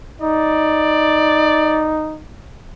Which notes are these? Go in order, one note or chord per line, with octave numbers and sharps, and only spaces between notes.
D#4 D5